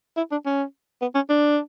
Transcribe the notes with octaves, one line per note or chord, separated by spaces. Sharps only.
E4
D4
C#4
B3
C#4
D4